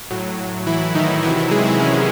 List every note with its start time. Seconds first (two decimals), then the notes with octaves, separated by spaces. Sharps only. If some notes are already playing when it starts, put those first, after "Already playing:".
0.11 A2 F#3
0.67 E3 E4
0.95 D#3 D#4
1.23 C3 D#3 E3 F#3 E4
1.37 E3 E4
1.51 G#3 G#4
1.66 E3 E4
1.80 C#4